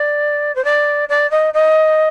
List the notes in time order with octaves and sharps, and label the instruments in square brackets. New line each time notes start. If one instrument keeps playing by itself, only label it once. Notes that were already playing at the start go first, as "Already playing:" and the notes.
Already playing: [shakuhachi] D5
C5
D5
D5
D#5
D#5